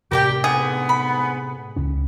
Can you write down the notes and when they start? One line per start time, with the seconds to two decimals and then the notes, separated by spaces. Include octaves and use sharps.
0.12 A2 C3 G4 A#4 D5 G5
0.44 G#2 D3 B3 G#4
0.89 B5
1.76 C#2 C#4